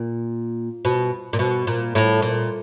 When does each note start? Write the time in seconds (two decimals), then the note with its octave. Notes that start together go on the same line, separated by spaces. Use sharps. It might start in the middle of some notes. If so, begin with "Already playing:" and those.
Already playing: A#2
0.85 B2
1.33 A#2
1.39 B2
1.67 A#2
1.95 A2
2.22 A#2